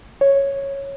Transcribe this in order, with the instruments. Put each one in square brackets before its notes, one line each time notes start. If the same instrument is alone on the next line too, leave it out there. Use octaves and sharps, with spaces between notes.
[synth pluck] C#5